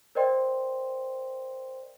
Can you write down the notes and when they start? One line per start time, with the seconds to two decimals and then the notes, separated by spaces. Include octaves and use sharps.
0.15 A#4 C5 D5 D#5 G5 C6